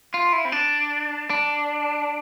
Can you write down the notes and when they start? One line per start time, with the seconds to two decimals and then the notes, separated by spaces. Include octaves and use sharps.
0.14 F4
0.33 E4
0.45 C4
0.52 D4
1.30 D4